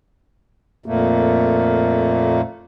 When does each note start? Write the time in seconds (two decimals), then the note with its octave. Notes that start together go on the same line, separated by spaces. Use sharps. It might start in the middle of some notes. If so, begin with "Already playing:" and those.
0.86 F2 A#2 A3 A#3